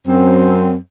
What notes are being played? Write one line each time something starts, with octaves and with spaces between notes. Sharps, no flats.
F#2 C4